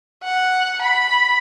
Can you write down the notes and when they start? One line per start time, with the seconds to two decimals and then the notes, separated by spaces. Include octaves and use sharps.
0.23 F#5
0.82 B5